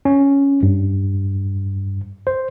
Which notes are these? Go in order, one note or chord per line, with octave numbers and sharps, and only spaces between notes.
C#4
G2
C5